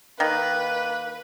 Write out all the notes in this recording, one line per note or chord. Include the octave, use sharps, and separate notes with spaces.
D#3 A#3 B4